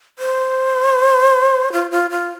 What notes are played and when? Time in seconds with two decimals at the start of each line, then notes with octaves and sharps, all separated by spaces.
0.19 C5
1.72 F4
1.91 F4
2.10 F4